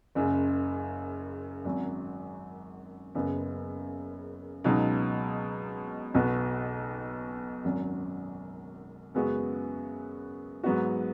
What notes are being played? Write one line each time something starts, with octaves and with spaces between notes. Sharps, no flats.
F#1 F#2 C#3
G#1 F#2 F#3
F#1 F#2 C#3 B3
C#2 B2 F#3 D#4
B1 B2 B3 F#4
G#1 F#2 F#3
F#2 C#3 G#3 B3 F#4
G#2 F#3 B3 F#4